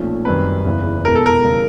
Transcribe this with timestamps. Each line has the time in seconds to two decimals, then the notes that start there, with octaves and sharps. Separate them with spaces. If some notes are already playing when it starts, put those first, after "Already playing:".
Already playing: B1 A#2 F3 A3 C#4
0.25 F#2 D#3 G3 C4 B4
0.65 F#1 E2 C#3
1.05 F1 E2 B2 G#3 A#4
1.15 A4
1.26 A#4
1.45 C#3 E3 G3